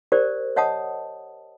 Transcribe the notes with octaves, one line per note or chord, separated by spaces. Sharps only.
G4 A#4 C5 D5
C#5 D#5 F#5 A5 D#6